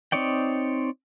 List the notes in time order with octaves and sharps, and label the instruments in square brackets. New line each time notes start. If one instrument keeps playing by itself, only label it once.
[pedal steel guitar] C4 D#4 C#5 D5 G5